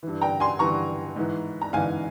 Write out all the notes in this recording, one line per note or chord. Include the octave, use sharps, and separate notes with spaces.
G2 E3
G5 A#5
G#5 C6
G2 E3 A#5 C#6
G#2 E3
A#5
G#2 E3 F5 G#5